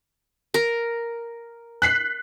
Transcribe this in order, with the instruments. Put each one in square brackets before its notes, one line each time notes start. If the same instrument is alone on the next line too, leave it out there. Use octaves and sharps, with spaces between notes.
[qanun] A#4
[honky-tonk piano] F#6 B6 C7